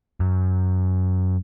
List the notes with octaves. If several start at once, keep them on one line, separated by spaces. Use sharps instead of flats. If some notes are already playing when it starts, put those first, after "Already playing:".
F#2